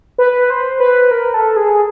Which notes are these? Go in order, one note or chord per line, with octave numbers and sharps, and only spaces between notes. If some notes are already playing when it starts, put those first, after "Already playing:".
B4
C5
B4
A#4
A4
G#4